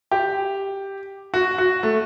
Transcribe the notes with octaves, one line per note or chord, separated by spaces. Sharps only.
G4
F#4
F#4
A3